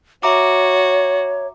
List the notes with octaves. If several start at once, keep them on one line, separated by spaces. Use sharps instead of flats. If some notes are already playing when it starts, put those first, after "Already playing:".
F#4 C#5 E5 A#5 D6